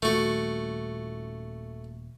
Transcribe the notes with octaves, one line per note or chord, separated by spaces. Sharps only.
D#1 A3 F#4